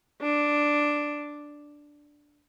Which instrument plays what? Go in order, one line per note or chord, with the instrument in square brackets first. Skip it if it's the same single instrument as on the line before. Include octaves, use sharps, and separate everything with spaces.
[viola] D4